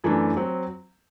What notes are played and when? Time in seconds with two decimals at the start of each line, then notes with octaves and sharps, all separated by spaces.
0.04 F#2 E3 A3 D4
0.37 F#3 C4